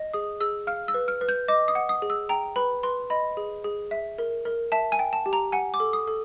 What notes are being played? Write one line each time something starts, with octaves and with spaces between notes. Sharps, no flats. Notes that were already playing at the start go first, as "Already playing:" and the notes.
Already playing: D#5
G#4 D#6
G#4 E6
F5 F6
E6
B4
F6
B4
G6
D#5 D6
D#6
F#5
D#6
G#4
E6
G5 A#5
B4 B5
B4 C6
D#5 B5
G#4
G#4
E5
A#4
A#4
E5 A5
G#5
G5
A5
G4
A#5
F#5 G#5
D6
A4
D#6
A4